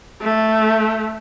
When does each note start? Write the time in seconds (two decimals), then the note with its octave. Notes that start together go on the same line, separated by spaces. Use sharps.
0.22 A3